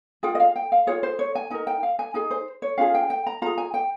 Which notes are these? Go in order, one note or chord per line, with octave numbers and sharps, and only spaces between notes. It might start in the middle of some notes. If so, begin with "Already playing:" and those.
F4 G#4 G5
D#5
F5
G5
F5
F4 G#4 C#5
C5
C#5
G#5
D#4 A#4 G#5
G5
F5
G#5
D#4 G#4 G#5
C5
C#5
C#4 F4 G#4 F5
G5
G5
A#5
F4 G#4 A#5
G#5
G5